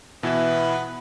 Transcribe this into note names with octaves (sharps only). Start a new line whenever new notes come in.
B2 E3 B3 E4 E5